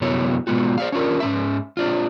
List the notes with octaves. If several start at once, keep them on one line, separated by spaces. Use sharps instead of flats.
F#2 C3 B3 E4 F#4 C#5
B2 G#3 B3 F4 F#4
C5 D5 F5
C#4 D4 F4 A#4
G#2 C#4 E5
C4 D4 F4